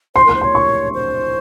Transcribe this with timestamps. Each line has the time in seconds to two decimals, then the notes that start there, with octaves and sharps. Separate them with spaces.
0.15 C5 C6
0.25 A#4 C6
0.35 C5
0.41 C#5 C6
0.55 C#6
0.94 C5